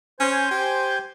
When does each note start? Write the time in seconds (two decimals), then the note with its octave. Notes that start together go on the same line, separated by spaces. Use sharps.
0.20 C#4 C5 G#5 G6
0.51 G4